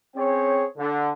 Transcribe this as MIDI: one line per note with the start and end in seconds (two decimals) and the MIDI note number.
0.16 0.64 60
0.16 0.64 61
0.16 0.64 68
0.16 0.64 73
0.16 0.64 79
0.78 1.12 50